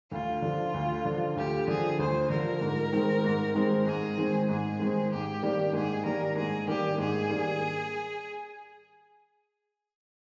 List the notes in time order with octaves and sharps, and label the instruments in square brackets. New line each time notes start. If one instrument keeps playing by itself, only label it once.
[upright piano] D2 [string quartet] F4
[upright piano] D3 F3
D2
D3 F3
[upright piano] D2 [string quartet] G4
[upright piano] D3 F3 [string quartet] G#4
[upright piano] D2 [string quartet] C5
[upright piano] D3 F3 [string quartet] A#4
[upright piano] G#2
D#3 G#3 C4
G#2
D#3 G#3 C4
[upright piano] G#2 [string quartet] G#4
[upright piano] D#3 G#3 C4
[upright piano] G#2 [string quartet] G#4
[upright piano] D#3 G#3 C4
[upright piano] G#2 [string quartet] G4
[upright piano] D#3 G3 A#3 D4
[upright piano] G#2 [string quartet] G#4
[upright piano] D#3 G3 A#3 D4 [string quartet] A#4
[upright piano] G#2 [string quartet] G#4
[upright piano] D#3 G3 A#3 D4 [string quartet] G4
[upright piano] G#2 [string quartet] G#4
[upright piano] D#3 G3 A#3 D4